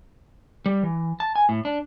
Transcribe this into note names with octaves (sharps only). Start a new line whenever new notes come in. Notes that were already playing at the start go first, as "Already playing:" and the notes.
G3
E3
A5
G#5
A2
D4